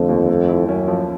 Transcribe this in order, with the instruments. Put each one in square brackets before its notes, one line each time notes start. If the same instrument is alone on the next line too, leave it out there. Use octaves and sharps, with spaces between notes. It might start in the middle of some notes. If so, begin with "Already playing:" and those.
Already playing: [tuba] F2 [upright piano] D3 F3 A3
[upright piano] D#2
A3
E4
[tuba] F#2 [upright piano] C#4
[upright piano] F3